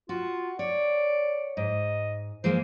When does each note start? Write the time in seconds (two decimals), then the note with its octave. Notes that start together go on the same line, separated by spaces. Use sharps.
0.09 F4 F#4
0.59 C#5 D5
1.57 G#2 D#5
2.44 E3 G#3 A#3 C5